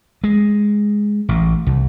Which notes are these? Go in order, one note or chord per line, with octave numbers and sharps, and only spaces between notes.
G#3
A1
C2